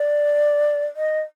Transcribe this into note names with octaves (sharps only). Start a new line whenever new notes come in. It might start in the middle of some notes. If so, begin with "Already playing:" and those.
Already playing: D5
D#5